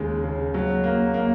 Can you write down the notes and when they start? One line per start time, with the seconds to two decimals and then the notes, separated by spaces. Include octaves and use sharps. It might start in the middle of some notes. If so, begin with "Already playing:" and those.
Already playing: D#2 C#3 G#3
0.24 C#3
0.54 F#3
0.84 A#3
1.14 A#3